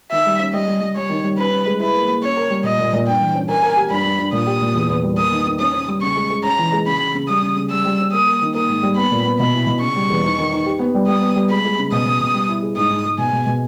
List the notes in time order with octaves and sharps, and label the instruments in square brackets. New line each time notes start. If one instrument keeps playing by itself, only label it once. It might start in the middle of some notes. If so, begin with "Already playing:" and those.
[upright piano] D#3 [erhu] E5
[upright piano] G3
C#4
[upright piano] G3 [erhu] D#5
[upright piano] G3
G3
[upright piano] G3 [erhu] C#5
[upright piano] D#3
G3
[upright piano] C#4 [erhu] B4
[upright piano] C#4
G#3
[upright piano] E4 [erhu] B4
[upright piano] A#3
A#3
[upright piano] C#4 [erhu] C#5
[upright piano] A#4
G3
[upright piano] A#2 [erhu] D#5
[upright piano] A#2
A#2
[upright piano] G2 [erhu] G5
[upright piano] E3
C#4
[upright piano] A#4 [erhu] G#5
[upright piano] A#4
G4
[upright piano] G2 [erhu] B5
[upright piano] G2
G2
[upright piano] A#2 [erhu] D#6
[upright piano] G4
A#2
E2
E2
G3
[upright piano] A#3 [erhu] D#6
[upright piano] D#3
D#3
[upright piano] C#4 [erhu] D#6
[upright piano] C#4
G3
[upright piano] C#3 [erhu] C#6
[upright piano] G#3
G#3
[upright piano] C#4 [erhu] A#5
[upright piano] E3
G#3
[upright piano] C#3 [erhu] B5
[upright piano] C#3
C#3
[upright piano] G3 [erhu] D#6
[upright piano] C#3
C#3
[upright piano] G3 [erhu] E6
[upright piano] G3
C#4
[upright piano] A#3 [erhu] D#6
[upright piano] A#3
D#3
[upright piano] A#3 [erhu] D#6
[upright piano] G#2
G3
[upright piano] B3 [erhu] B5
[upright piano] A#2
B3
[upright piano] B2 [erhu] B5
[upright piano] E4
B2
[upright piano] C#3 [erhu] C#6
[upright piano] G3
E2
D#4
D#3
D#4
G4
B3
G3
[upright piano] G3 [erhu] D#6
[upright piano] B3
G3
[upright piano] G#3 [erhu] B5
[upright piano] G#3
C#3
[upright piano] B2 [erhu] D#6
[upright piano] B2
B2
G3
E4
G#4
[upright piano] G#2 [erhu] D#6
[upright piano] G#2
G#3
[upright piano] B2 [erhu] G#5
[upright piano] B2
B2